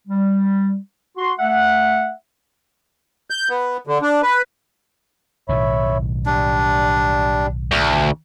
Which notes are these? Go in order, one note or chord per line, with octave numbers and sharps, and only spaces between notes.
G3
F#4 C6
A3 E5 F#5
G6
B3
D3
D4
B4
B1 A2 D#3 C#5 E5 B5
G3 D4
D2